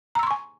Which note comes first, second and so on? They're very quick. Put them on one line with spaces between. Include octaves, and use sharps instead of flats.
A#5 E6 C6 C#6 G#5